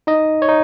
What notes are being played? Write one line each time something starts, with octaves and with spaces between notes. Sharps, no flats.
D#4 D#5
C#5
D#4